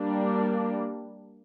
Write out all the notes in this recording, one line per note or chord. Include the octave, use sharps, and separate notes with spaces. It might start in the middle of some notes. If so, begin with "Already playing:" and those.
Already playing: G3 A#3 D4